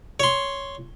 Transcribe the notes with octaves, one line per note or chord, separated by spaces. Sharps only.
C#5 C6